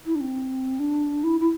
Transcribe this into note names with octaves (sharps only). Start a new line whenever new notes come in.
E4
D4
C4
D4
E4
E4